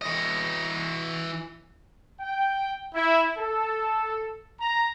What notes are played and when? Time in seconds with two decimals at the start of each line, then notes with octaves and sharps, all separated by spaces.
0.02 E3 D#5
2.20 G5
2.95 E4
3.38 A4
4.60 A#5